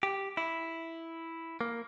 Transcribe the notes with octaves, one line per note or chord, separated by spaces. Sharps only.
G4
E4
A#3